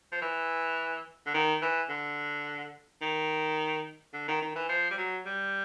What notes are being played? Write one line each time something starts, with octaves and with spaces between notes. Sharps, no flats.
F3
E3
D3
D#3
E3
D3
D#3
D3
D#3
D#3
E3
F3
G3
F#3
G3